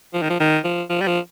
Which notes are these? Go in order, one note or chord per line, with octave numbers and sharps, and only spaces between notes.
F3
D#3
F3
D#3
F3
F3
G3
F3